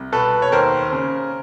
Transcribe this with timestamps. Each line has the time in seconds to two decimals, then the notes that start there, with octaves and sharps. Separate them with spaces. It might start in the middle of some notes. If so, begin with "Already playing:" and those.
Already playing: C2
0.12 B2 A4 B4
0.42 C#5
0.52 D#2 A#4 C5
0.93 C#3